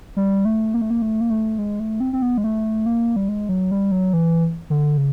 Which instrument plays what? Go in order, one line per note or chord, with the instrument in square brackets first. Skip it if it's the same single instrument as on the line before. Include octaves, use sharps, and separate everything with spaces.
[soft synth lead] G3
A3
A#3
A3
A#3
A3
A#3
A3
G#3
A3
C4
C4
B3
G#3
A3
A#3
G3
G#3
F#3
G3
F#3
E3
D3
C#3